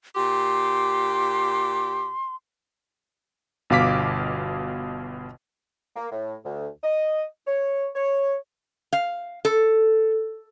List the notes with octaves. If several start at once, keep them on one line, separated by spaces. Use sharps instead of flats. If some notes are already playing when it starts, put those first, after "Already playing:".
A#2 G4 C6
G1 B2 F5 D6 B6
A#3
A2
D2
D#5
C#5
C#5
F5
A4